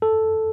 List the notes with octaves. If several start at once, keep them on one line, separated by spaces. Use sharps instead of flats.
A4